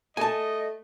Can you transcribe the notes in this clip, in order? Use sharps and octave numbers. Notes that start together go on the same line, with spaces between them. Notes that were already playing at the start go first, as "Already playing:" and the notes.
A3 D#5 G#5 A5